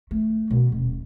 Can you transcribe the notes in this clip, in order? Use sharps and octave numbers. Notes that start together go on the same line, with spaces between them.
A3
B2
D#1